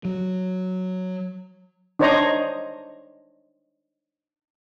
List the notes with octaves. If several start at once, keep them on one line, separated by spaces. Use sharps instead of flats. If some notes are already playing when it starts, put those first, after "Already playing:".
F#3
D4 D#4 C5 C#5 D#5 A#5